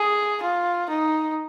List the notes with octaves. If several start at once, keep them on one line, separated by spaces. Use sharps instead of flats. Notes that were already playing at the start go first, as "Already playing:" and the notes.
Already playing: G#4
F4
D#4